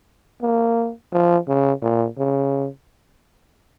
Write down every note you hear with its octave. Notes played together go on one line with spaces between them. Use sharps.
A#3
F3
C#3
A#2
C#3